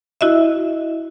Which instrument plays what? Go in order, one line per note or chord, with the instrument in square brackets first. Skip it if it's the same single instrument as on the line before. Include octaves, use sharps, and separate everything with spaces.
[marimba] E4 F#4 D#5 E5